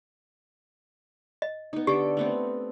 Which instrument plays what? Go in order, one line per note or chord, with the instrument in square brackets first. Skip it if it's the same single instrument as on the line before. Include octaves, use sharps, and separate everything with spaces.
[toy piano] D#5
[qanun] B3 D#4
[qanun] D3 A4 D6 [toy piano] G4
[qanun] A3 B3 C4